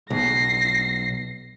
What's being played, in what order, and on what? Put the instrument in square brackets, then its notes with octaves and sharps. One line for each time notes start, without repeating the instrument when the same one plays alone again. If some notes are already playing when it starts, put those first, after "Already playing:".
[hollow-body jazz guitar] B1 [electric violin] A#6 C7